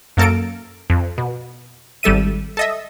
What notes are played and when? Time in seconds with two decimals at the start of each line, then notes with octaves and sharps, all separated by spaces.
0.17 F#2 A#3 A4 A#4 D7
0.90 F2
1.18 B2
2.03 G#1 G3 A4 E5 D#7
2.57 A4 D#5 E5